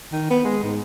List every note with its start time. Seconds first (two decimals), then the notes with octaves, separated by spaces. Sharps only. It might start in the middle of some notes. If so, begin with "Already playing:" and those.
0.12 D#3
0.31 B3
0.45 G#3
0.63 G#2